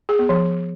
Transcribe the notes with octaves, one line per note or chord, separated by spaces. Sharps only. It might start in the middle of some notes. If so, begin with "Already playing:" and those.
G#4
B3
F3